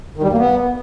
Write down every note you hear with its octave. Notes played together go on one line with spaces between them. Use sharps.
D#3
G3
F#2
A#3
B3